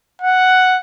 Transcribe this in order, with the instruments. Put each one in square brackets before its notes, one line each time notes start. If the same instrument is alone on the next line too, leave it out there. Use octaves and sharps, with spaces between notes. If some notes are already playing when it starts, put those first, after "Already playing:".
[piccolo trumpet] F#5